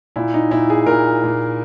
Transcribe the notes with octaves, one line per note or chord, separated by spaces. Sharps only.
A#2 E4
D#4
A#2 E4
G#4
A#2 A#4
A#2